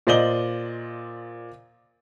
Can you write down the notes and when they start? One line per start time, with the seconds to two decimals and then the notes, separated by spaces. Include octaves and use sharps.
0.07 A#2 C5 D5 D#5 F#7 G7